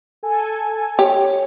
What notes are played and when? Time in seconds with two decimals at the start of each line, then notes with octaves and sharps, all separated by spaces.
0.23 A4 G#5
0.99 G4 C#5